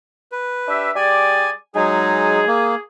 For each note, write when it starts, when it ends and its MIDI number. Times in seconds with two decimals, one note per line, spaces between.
0.32 0.91 71
0.68 0.90 62
0.68 0.90 67
0.68 0.90 76
0.96 1.50 55
0.96 1.50 68
0.96 1.50 74
0.96 1.50 80
1.75 2.45 54
1.75 2.45 56
1.75 2.45 63
1.75 2.78 68
2.47 2.75 58